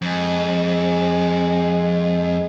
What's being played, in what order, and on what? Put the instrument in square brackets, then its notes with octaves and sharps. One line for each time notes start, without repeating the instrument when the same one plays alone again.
[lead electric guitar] F2 [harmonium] G#3